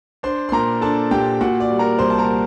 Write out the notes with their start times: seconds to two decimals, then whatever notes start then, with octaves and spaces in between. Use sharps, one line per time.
0.23 D4 C5 C6
0.49 C6
0.52 A#2 A#4 A#5
0.81 D4 A4 A5
1.11 A#2 G4 G5
1.41 A#2 F#4 F#5
1.60 D5
1.70 G3
1.79 A#4 A#5
1.99 C2 C5 C6
2.10 A5
2.18 A#4 A#5
2.28 G3